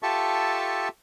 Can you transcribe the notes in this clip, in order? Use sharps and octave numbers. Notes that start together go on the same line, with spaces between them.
F4 G4 A4 E5 A5 C#6